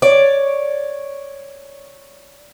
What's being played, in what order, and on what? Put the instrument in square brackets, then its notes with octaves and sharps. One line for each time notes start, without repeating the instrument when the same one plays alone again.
[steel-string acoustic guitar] C#5 D5